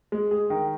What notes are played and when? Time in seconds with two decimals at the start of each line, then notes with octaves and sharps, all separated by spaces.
0.12 G#3
0.31 G#4
0.50 D#3